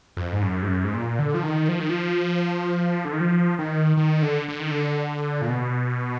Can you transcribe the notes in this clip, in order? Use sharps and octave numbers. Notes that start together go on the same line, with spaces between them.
F2
G#2
F#2
G#2
F#2
G#2
A#2
D3
F3
D#3
F3
D#3
F3
D3
D#3
F3
D#3
D#3
D3
D3
D#3
D3
A#2
B2